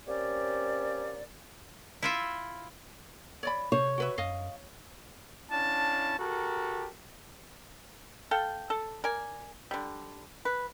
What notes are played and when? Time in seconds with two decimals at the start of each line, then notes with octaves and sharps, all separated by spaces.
0.07 A#3 C4 C#4 G4 C#5 D5
2.02 E4 F4 E5
3.43 C#5 D5 B5
3.72 C3 C5 C#5
3.98 F#4 B4 E5
4.18 F#2 D#5 F5
5.50 C#4 D4 E4 F5 A5
6.19 F#4 G4 A4 A#4
8.31 A4 F5 G5
8.70 A4
9.04 A#4 D5 G#5
9.71 D3 G3
10.45 B4